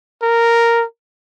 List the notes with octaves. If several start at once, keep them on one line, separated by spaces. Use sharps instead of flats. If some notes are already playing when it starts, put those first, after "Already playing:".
A#4